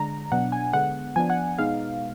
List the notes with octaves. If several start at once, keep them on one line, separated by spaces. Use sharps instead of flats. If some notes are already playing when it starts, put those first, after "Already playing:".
Already playing: D3 G#3 D4 A#5
B2 F#3 B3 D4 F#5
G#5
D3 G#3 B3 F#5
F3 B3 D4 G#5
F#5
B2 G#3 B3 D#4 F5